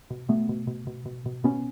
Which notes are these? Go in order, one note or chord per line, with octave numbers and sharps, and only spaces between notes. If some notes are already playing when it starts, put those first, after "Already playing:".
B2
B2 A3 B3
B2
B2
B2
B2
B2
B2 B3 C#4